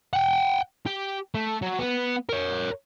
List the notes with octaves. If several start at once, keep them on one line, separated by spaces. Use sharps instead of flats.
F#5 G5
G4
A3
F#3
B3
A#4 C#5